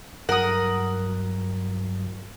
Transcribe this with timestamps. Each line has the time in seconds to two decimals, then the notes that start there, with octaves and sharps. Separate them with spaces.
0.29 G2 F#3 A#4 F#5 D#6